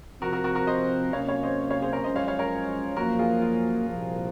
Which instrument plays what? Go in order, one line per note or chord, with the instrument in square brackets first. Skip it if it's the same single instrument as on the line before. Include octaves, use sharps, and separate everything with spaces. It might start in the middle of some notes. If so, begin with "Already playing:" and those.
[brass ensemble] C3 F3 C4 [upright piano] F#4 A#4
[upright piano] F#4 A#4
F#4 A#4
F#4 A#4
C5 D#5
[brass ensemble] C3 F#3 A#3 C#4 [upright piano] C#5 F5
[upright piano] C#5 F5
C5 D#5
C#5 F5
G#4 C5
A#4 C#5
[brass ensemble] F#2 F3 G#3 C#4 [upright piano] C5 D#5
[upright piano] C#5 F5
C#5 F5
A#4 C#5
[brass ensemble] F#2 F3 A#3 [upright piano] F#4 A#4
[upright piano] F4 G#4
F4
[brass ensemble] C2 A#2 F3